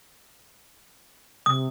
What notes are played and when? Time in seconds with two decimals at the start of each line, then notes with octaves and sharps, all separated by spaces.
1.46 C3 D#6